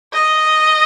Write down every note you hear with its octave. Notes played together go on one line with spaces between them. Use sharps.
D#5